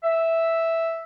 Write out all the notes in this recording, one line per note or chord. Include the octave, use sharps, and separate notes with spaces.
E5